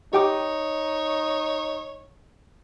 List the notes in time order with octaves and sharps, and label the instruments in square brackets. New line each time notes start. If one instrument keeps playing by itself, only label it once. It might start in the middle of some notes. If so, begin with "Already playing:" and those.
[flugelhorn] D#4 [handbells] G4 G5 D6 [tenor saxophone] C#5